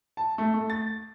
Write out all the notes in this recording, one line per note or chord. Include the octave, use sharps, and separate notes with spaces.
A5
A3
A3
A6